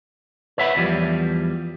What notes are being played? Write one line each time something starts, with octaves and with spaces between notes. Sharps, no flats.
B4 C#5 E5 F#5 B5
E2 F3 G3